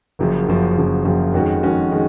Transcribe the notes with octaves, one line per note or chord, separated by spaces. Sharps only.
F#1 F#2 C#3 F3
F#1 F#2 C#3 F3
F#1 F#2 C#3 F3
F#1 F#2 C#3 F3
F2 D#3 G#3 C#4 F#4
F2 D#3 G#3 C#4 F#4
D#3 G#3